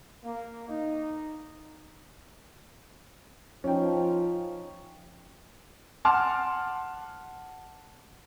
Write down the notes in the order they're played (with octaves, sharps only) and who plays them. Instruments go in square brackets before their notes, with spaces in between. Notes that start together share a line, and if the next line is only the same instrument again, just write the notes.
[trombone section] A#3
D#4
[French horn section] F3 [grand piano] C#4 D#4 G5
[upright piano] F#5 A5 C6 D6 F6